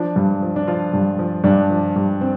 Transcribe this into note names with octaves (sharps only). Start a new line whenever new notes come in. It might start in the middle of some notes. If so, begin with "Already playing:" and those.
Already playing: F3 D4
G2
F3
D4
F3 F4
G2
F3
G2 D4
F3
G2
C4